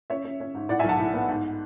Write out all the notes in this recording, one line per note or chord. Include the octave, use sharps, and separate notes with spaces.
C#4 C#5 E5
C#4
C#4
G#2
A2 D5 F#5
E5 G#5
B1 F#5 A5
A2
B3
G#2